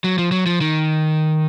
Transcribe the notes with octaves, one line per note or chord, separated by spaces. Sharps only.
F#3
F3
F#3
F3
D#3